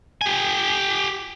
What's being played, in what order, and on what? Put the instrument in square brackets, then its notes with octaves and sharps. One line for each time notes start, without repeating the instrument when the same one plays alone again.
[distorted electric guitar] G4 G#5